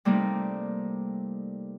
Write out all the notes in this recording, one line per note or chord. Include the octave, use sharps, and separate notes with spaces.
C3 G3 A3 A#3 D#4